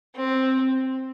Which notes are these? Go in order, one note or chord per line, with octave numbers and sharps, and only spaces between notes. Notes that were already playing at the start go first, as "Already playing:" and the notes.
C4